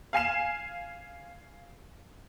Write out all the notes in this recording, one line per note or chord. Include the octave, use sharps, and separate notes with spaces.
F5 G#5 C7 E7